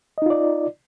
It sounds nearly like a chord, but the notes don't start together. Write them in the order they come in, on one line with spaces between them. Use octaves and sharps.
D#5 D#4 F4 D5